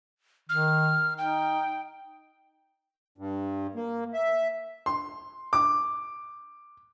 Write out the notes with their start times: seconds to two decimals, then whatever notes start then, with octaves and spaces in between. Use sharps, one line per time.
0.49 D#3 F6
1.18 D#4 G5
3.18 G2
3.75 A#3
4.14 E5
4.86 C6
5.53 D6